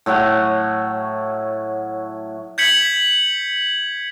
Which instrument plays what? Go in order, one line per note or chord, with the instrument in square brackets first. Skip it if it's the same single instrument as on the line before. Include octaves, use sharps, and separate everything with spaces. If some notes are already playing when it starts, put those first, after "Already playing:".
[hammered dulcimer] A2 F#3 C#5 F#5
[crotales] G6 G#6 B6 C#7 F#7